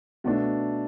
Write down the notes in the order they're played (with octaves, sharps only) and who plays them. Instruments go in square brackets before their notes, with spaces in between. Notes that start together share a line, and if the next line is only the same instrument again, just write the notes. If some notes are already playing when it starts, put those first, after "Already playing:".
[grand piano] B2 A3 D4